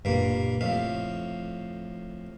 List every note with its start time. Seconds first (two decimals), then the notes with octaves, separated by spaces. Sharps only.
0.05 F#1 G2 A#2 A#3
0.61 F2 A2 F5